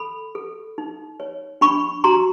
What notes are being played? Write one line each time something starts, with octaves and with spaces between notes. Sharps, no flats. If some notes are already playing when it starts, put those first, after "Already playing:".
Already playing: A4 B5
A4
D#4
C#5
D4 B5 C#6
F#4 A#5 C6